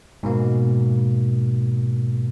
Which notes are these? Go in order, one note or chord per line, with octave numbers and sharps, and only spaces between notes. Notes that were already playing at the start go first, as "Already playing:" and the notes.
G#2 B2 A#3